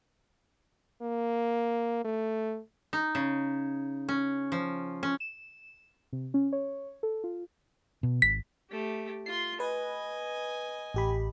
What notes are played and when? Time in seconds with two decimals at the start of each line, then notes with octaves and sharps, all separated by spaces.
1.02 A#3
2.04 A3
2.93 D#4
3.15 C#3
4.09 C#4
4.52 F3
5.03 C#4
5.20 E7
6.13 C3
6.34 C#4
6.53 C#5
7.03 A4
7.24 F4
8.03 B2
8.22 G#1 B6
8.70 A3 G4
9.26 F4 C6 C7
9.60 B4 D#5 G#5
10.94 A1 G4 B5